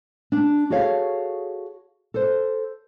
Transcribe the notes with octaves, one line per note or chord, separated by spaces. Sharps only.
D4
F#4 G#4 A4 C#5 F5
A4 C5